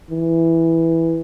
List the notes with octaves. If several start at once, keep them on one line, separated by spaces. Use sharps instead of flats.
E3